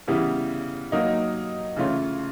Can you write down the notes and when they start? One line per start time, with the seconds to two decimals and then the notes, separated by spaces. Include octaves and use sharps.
0.08 C#3 E3 G3 B3 E4
0.92 F#3 A#3 D#4
1.77 C#3 E3 A3 C#4 F4